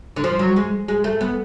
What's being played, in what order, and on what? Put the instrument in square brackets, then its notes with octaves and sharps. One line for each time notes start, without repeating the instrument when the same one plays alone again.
[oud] D3
F3
F#3
G#3
G#3
A3
B3